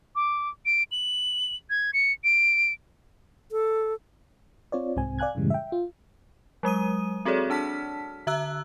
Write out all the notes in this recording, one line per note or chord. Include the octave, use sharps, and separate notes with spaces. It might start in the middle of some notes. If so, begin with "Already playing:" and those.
D6
D7
F#7
G#6
C#7
D7
A4
C4 F4 C#5 D5
C2 G#2 C3 C4 G#5
D5 F5 G#5 F#6 G#6
F#2 A2 C#3 E3 G3 G#3
E5 G5
F4
F#3 G#3 D#6 D#7
C4 F#4 G#4 A4 C#5 D5
D4 A5 F6 B6
D3 E5 A#5 E6 F#6